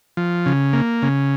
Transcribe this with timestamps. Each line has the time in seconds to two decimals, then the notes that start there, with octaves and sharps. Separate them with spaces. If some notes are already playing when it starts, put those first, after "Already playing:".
0.17 F3
0.46 C#3
0.73 A#3
1.02 C#3